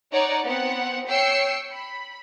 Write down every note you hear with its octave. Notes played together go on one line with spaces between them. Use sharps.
D#4 C#5 D5 F#5 A#5
B3 C4 F#5
C#5 G5 E6 C7 C#7
B5